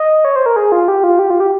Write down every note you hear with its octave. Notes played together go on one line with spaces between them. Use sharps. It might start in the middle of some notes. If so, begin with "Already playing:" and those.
Already playing: D#5
C#5
C5
A#4
G#4
F4
G4
F4
G4
F4
G4